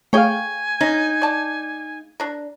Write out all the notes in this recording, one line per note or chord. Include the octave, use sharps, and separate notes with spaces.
A3 G#4 C#5 F5 G5 G#5
C#4 D#4
D5 A5
D4 A#4